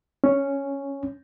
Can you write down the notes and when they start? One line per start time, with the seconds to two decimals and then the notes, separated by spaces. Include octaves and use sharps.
0.24 C#4